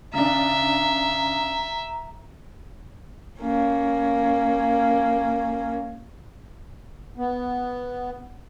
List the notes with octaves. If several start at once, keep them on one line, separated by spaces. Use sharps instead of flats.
C#3 D4 E5 A#5
A#3 C#4
B3